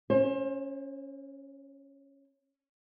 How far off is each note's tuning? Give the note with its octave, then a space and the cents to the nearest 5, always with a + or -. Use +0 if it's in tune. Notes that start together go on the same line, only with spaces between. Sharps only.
C#4 -5 C5 +35